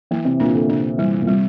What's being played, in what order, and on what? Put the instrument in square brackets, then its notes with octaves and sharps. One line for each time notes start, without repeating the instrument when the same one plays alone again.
[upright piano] E3 [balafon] A#3
[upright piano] C3
[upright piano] A#2 [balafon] D4
[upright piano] D3
[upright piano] C3 [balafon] D4
[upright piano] E3 [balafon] G3
[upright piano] A#2
[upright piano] C3 [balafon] G3